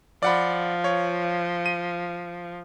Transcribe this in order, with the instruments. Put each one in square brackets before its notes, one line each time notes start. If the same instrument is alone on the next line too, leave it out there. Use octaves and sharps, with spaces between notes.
[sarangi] F3 [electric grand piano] D5 F#5 B5
[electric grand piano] C#5
D#7